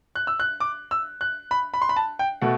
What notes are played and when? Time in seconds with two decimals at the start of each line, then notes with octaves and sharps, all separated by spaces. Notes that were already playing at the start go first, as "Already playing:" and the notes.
0.15 F#6
0.27 E6
0.40 F#6
0.60 D6
0.91 E6
1.21 F#6
1.51 B5
1.74 B5
1.82 C6
1.89 B5
1.96 A5
2.19 G5
2.42 B2 A3 F#5